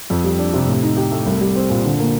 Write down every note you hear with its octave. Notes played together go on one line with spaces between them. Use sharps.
F2
G3
D4
C3
A2
D#4
G4
A3
C2
G3
C4
A#2
D3
A#3